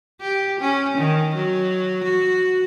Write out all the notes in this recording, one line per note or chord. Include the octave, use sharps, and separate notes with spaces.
G4
C#4
D#3
F#3
F#4